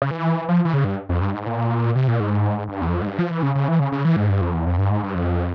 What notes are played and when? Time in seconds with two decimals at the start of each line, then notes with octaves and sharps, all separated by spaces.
0.02 C#3
0.11 E3
0.49 F3
0.65 E3
0.73 C#3
0.84 G2
1.09 F2
1.21 G2
1.34 G#2
1.46 A#2
1.96 C3
2.08 A#2
2.20 G#2
2.69 G2
2.81 E2
2.88 F2
3.02 G#2
3.07 G2
3.19 F3
3.30 E3
3.43 C#3
3.55 C#3
3.68 E3
3.80 C#3
3.92 C#3
4.05 E3
4.16 G#2
4.29 G2
4.41 F2
4.54 E2
4.66 F2
4.78 G2
4.90 G#2
5.03 G2
5.15 F2